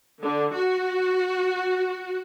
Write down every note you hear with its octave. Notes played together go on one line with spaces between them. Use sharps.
D3
F#4